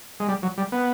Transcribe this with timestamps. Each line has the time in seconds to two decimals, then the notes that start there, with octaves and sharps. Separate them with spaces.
0.20 G#3
0.28 G3
0.43 F#3
0.58 G3
0.72 B3